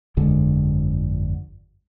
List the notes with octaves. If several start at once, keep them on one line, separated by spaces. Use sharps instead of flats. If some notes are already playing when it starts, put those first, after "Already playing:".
G1 F2 D3 G#3